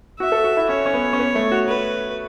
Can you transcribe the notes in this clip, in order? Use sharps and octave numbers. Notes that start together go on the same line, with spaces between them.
F#4 E5
A4
F#4
E4
C#4 C#5
C#4
B3
C#4
B3
A3
F#4
B4